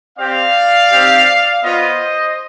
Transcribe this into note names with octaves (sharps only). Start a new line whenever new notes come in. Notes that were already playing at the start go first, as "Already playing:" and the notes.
C4 G4 D5 F5
C4 D#4 G4
B3 F4 C5 D#5